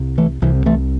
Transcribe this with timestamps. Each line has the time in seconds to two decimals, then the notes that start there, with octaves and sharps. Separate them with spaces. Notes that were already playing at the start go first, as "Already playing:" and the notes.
Already playing: C2 C3
0.18 E3 A3
0.42 C2 C3 E3
0.66 E3 A3